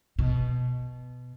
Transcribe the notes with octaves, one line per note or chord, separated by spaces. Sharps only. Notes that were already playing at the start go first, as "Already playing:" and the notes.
B2